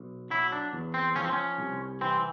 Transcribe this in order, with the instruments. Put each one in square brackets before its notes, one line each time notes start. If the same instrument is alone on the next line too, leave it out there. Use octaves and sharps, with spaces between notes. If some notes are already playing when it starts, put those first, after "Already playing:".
Already playing: [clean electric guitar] B1
F#3 E4
D4
E2
C4
F3 C#4
C4
C#4
C2
E3 C4